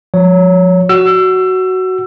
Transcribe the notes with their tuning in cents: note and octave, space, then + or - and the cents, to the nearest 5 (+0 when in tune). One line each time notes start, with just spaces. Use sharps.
F3 +25 C#5 +15
F#4 +10 E6 +25